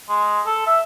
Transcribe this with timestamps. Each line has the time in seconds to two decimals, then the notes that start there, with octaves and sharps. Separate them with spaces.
0.09 G#3
0.46 A4
0.67 E5